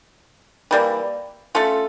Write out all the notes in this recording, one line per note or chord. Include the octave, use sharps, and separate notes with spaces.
E3 G3 A#3
A3 C#4 F4 A4